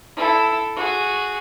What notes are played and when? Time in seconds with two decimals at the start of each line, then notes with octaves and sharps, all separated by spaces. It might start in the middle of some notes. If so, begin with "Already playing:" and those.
0.16 E4 A4
0.76 F#4 G#4